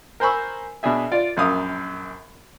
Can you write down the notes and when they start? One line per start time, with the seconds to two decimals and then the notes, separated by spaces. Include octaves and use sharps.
0.20 A#4 C5 G#5 B5 C#6 E6
0.83 B2 D4 G#4 E5
1.12 F4 D5
1.37 A#1 F#2 F5 D#6